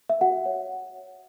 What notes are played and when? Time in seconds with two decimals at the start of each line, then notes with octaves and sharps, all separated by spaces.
0.10 E5
0.21 F#4 F#5
0.46 C#5